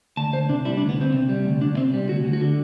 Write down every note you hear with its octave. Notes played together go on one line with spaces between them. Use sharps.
D2 A5
D2 C5
C3 D4
G3 E4
D4
D2
B3
D2 C4
C3
G3
D2
D2 D4
C3 C4
G3
D2 F#4
D2
F#4
D3